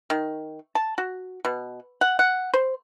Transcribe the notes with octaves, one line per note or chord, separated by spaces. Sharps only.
D#3
A5
F#4
B2
F#5
F#5
C5